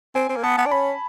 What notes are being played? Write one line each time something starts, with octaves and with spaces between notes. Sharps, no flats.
C4 G#5
C4
A#3
B3 A5
B3
D4
C#4 B5